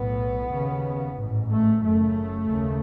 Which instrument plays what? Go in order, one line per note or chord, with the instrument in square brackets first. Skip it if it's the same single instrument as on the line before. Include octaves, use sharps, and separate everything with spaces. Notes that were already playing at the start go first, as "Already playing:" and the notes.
Already playing: [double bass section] B1 A2 B3
D#2 C#3
A1 G#2
A3
F#1 F#2 C#3 A3
D#2 C#3